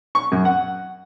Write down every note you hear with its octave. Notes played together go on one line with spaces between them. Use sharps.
C#6
F#2
F#5